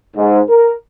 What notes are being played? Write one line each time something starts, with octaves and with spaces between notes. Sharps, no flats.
G#2
A#4